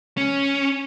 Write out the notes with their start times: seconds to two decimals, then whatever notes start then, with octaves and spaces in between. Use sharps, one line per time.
0.17 C#4